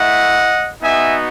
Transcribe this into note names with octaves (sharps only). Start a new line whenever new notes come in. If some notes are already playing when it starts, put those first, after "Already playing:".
Already playing: A3 E4 D#5 F#5
B3 D#4 F#4 E5 G#5